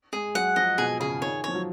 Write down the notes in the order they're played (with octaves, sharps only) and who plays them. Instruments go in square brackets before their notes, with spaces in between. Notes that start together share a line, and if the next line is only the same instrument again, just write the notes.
[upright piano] G#3 [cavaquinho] G#4
[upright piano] F#3 [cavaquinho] F#5
[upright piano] F3 [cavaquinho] D#5
[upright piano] B2 [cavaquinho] G#4
[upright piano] C#3 [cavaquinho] G#4
[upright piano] D#3 [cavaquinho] C#5
[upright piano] F3 [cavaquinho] C#5
[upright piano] F#3